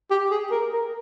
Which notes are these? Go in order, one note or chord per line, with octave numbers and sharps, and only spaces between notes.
G4
G#4
A#4
A#4